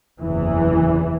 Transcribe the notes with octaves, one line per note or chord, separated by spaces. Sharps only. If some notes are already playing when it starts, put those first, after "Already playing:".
F#1 E2 C3 E3